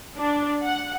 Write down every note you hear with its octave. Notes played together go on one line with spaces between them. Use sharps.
D4
F#5